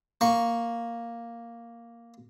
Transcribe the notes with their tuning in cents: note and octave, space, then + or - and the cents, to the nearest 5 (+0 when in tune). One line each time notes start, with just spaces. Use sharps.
A#3 +0 C#6 +0